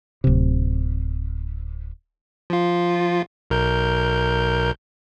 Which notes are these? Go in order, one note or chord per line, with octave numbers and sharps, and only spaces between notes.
D1 C3
F3 F4
B1 A#4 G6